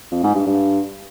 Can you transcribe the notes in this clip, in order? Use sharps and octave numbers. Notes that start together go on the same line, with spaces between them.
F2
G#2
G2
G2